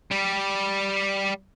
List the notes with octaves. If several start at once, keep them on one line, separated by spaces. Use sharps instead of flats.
G3 G4